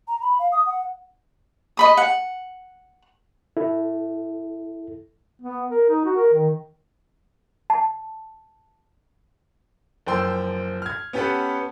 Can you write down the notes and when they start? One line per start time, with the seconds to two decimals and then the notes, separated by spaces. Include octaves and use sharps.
0.08 A#5
0.22 B5
0.39 F5
0.52 D#6
0.66 F#5
1.77 D#5 B5 D#6
1.97 F#5
3.57 E4 A4
5.41 B3
5.70 A#4
5.89 D#4
6.05 F#4
6.16 A#4
6.33 D#3
7.70 A5
10.07 F#1 F3 G5 C6 E6
10.82 F6 G#6
11.13 B3 C#4 G4 A4 B4 F#5